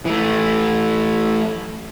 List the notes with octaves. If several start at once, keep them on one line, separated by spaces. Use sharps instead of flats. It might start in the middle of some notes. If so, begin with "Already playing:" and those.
E3 A3